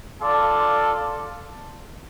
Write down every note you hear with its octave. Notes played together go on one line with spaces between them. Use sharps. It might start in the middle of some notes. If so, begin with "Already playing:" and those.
F4 A4 D5